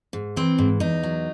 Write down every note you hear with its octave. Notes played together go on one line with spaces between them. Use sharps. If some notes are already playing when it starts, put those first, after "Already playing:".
G#2
E3 C4
G#2
E2 D#4
F#3